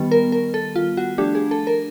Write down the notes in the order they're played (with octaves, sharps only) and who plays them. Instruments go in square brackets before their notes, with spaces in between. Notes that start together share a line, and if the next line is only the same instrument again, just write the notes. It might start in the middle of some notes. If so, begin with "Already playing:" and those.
Already playing: [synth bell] D#3 G3 B3
A#4
A#4
A4
F4
F#4
F3 A3 D4 G4
G#4
A4
A#4